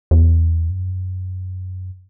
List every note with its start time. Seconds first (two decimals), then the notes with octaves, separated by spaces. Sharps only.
0.11 E2
0.70 F#2